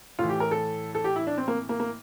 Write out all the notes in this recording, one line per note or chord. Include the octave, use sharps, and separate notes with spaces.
A2 E3 F4
G4
A#4
A4
A4
G4
E4
D4
C4
A#3
A#3
A#3